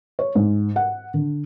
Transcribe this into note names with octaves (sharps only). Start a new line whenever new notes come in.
C#5
G#2
F#5
D3